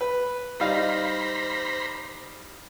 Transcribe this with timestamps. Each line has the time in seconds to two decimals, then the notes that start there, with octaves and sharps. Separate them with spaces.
0.01 B4
0.60 G3 D#4 C5 F5 A#5 B5